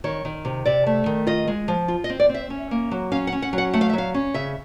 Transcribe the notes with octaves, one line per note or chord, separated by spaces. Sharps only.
D#3 C#5
D#3
C3
C3 D5
A3
D#3
F4 D#5
G#3
F3
F4
D#5
C4
D5
C4
E5
C#4
A#3
F#3
C#4 F5
F#5
C#4
F#5
F#3
F#5
A3 F#5
F5
E5
F#3 F5
C#4
C#3 E5